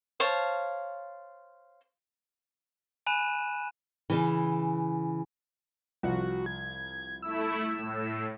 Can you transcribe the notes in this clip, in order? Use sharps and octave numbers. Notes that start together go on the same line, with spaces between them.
C5 C#5 F5 A5
G#5 B5 F#6 D#7 E7
C#3 E3
C2 F3 F#4
G#6
A3 E4 E6
A2